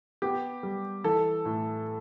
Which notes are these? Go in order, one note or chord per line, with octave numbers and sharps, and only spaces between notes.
B3 G4
G3
E3 A4
A2